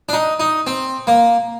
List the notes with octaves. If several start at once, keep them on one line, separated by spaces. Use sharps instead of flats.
D4
D#4
D#4
C4
A#3